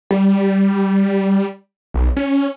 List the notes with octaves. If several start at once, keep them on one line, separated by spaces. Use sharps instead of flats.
G3
B1
C#4